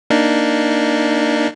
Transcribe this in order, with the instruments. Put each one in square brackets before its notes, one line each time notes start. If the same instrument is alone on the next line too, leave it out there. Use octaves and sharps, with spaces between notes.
[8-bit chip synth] A#3 D4 D#4